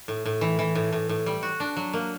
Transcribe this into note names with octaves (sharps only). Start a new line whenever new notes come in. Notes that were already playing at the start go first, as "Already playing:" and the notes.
A2
A2
E3
E3
A2
A2
A2
G3
F#4
D4
F#3
A#3